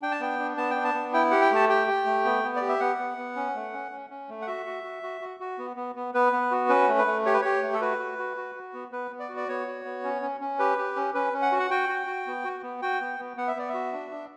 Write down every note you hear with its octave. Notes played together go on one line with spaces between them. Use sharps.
D4 G5
A5
B3 G5
D4
B3 A5
G5
D4
A5
B3
E4 G5
G4 F#5
G5
A3 A5
G4 G5
G4
A3
B3
B3
D5
G4
E5
B3 F#5
B3
B3
C#4
A3
C#4
C#4
C#4
A3
F#5
F#4 E5
F#4
F#4
F#4
F#4
F#4
B3
B3
B3
B3 B4
B3
F#4
C#4 B4
A3
B4
A3
G4 C#5
B4
G4 C#5
A3
A4
F#4 B4
F#4
F#4
F#4
F#4
B3
B3 B4
B3
D5
F#4
D5
B3 C#5
F#4
B3
C#4
C#4
C#4
G4 B4
G4
C#4
C#4 B4
C#4
F#5
F#4
F#5
F#4 G5
F#4
F#4
B3
F#4
B3
F#4 G5
B3
B3
B3 F#5
E5
B3 D5
F#4 E5
D4
D4